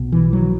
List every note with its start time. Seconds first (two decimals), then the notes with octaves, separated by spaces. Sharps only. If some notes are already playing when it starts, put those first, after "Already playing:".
Already playing: B1 B2
0.12 E3
0.33 F#3